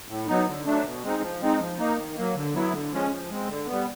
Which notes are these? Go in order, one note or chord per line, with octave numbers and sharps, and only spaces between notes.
A2
F#3 B3 D#4
D3
F#3 A3 D4
B2
G#3 C4 D#4
F3
G#3 C4 D#4
F3
A#3 D#4
D#3
F#3 A#3
D3
F#3 B3 E4
D3
F3 G#3 C#4
F3
G#3 C4
D3
G3 B3